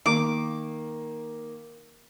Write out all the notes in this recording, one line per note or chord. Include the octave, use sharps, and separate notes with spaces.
D#3 A#3 D6